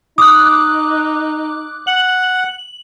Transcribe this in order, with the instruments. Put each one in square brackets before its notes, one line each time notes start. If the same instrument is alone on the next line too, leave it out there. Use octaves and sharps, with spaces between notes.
[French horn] D#4 [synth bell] D6 F#6 [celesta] D#6
[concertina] F#5 [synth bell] F#7